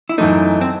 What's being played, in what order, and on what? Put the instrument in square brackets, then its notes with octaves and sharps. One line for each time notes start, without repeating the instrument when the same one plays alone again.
[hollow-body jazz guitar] E4
[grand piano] F#2 E3 A3 [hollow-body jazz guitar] D#4
[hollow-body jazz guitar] C4